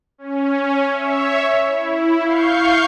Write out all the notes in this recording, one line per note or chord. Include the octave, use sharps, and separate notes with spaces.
C#4
C#5 E5
E4
F5 C#6 G6 C7